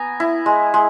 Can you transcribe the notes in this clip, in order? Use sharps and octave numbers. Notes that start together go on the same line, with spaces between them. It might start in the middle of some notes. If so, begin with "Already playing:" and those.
Already playing: B3 G#5 A#5
E4
G#3
G#3